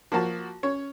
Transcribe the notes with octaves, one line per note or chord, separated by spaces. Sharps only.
F3 A#3 F#4 A5
C#4 C#5